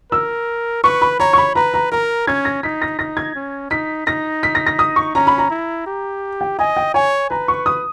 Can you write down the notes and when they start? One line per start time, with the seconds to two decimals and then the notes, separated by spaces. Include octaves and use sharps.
0.12 A#4 E6
0.84 B4 C#6
1.01 B5
1.20 C#5 A#5
1.33 C#6
1.38 B5
1.55 B4 A#5
1.74 A#5
1.92 A#4 A#5
2.27 C#4 G#6
2.45 A#6
2.63 D#4 B6
2.82 A#6
2.99 D#4 A#6
3.17 G#6
3.35 C#4
3.71 D#4 B6
4.07 D#4 A#6
4.43 B6
4.55 A#6
4.66 A#6
4.79 D#6
4.96 C#6
5.15 C#4 A#5
5.27 B5
5.38 A#5
5.50 E4
5.86 G4
6.41 G5
6.59 D#5 G#5
6.77 G5
6.94 C#5 G#5
7.30 B4 A#5
7.48 C#6
7.66 D#6